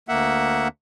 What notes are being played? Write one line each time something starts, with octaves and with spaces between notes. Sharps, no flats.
D2 A#3 E5 F#5